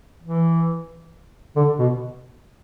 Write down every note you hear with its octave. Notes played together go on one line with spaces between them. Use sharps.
E3
D3
B2